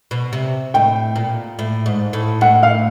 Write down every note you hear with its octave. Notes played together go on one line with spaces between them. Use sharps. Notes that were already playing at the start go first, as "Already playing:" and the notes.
B2
C3
A2 G5
A#2
A2
G#2
A2
A2 F#5
F5